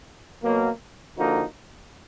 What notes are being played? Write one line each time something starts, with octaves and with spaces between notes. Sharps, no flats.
B2 F#3 A#3
D3 F3 A#3 D#4 F#4